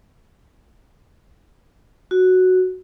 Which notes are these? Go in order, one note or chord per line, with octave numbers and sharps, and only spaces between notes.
F#4